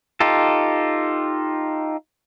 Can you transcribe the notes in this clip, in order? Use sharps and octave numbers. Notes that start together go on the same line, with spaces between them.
D#4 F4 G4 A4